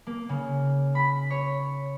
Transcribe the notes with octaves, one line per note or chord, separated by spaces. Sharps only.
A#3
C#3
B5
C#5